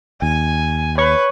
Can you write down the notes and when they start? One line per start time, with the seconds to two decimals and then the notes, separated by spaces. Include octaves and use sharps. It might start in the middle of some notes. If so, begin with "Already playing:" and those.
0.22 D#2 G#5
0.98 B4 C#5 C#6